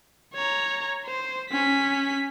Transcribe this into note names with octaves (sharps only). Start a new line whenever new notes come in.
C#5 A#5
C5
C#4 B6